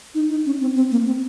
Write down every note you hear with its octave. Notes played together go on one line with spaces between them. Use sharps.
D#4
D#4
C#4
C4
C4
A#3
C4